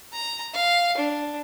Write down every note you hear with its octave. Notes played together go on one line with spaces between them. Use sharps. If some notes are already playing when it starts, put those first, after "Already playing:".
A#5
F5
D4